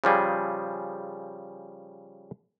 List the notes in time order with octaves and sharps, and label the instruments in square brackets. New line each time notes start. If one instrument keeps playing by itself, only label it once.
[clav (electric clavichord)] C#3 F3 G3 G#4